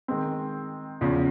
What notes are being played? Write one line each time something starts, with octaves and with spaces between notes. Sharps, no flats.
D#3 G#3 C4
E2 C#3 F3